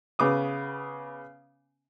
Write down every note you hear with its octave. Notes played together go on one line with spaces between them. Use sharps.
C#3 B3 D6 D#6